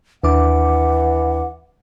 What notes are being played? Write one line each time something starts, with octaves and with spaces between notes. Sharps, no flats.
D#2 E3 D4 F#5 D6